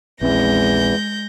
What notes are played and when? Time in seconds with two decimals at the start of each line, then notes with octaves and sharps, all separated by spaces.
0.21 A#1 E2 E3 G#3 C4 C#4 G6 A#6